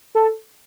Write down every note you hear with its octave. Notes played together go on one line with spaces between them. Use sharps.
A4